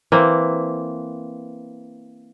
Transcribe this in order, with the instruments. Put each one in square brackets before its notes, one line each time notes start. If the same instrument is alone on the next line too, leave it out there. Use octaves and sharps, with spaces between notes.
[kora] E3 A#3 C4